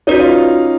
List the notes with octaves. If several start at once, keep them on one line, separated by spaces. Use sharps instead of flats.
C#4 D#4 F#4 B4 D5
F4